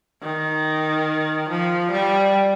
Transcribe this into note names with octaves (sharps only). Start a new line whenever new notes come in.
D#3
F3
G3